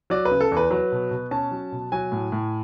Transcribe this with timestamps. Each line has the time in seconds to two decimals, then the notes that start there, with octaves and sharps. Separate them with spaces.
0.10 F#3 D5
0.25 B4
0.31 C#3
0.41 A4
0.52 E2
0.57 B4
0.71 F#3 B4
0.92 B2
1.11 B2
1.31 C#4 A5
1.51 F#3
1.72 B2
1.92 F#3 G#5
2.12 A2
2.32 A2